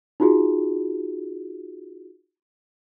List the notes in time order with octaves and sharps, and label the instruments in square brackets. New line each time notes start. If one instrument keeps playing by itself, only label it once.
[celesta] D#4 F4 F#4 G#4